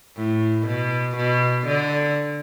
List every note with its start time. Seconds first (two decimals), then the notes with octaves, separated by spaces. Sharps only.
0.17 A2
0.67 B2
1.17 B2
1.67 D3